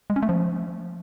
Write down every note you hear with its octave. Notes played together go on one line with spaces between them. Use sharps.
G#3
C#4
A3
F3